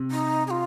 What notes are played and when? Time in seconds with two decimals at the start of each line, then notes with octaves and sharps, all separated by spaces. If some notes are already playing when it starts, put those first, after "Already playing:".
Already playing: C3
0.11 D#4
0.47 G#4
0.51 F4